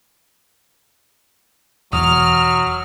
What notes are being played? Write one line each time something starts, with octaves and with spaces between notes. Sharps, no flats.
E1 E2 F#3 D#6 F6